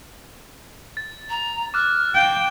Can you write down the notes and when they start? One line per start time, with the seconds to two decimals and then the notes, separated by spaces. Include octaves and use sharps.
0.97 A6
1.30 A#5
1.74 D6 F6 F#6
2.15 F5 G5